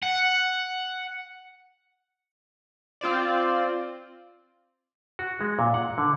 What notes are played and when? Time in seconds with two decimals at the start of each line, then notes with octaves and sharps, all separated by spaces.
0.03 F#5
3.01 C4 F4 C5 D5
5.19 F#4
5.41 G#3
5.59 A#2
5.74 F#5
5.98 D3